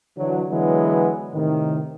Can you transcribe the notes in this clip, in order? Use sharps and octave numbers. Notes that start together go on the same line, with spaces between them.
D3 E3 F#3
D3 E3 F#3 G#3 B3
A2 C3 D#3